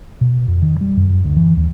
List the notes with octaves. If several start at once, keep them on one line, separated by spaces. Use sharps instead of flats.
B2
F2
D#3
G3
F#2
D2
E3
D#2